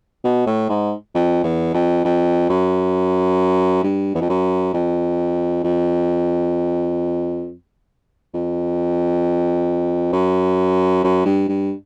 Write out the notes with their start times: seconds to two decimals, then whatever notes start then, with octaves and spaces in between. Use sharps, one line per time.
0.24 B2
0.46 A2
0.69 G#2
1.15 F2
1.44 E2
1.74 F2
2.05 F2
2.49 F#2
3.83 G2
4.15 E2
4.21 F2
4.29 F#2
4.73 F2
5.63 F2
8.34 F2
10.13 F#2
11.04 F#2
11.25 G2
11.49 G2